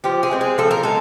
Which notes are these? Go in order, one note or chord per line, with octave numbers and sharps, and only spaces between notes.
F3 G4
G#4
G#3 C4
G#4
F3 A4
A#4
G#3 A4